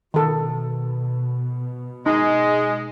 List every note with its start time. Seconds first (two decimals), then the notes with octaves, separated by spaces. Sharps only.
0.14 B2 D#3 A4
2.06 G#3 D#4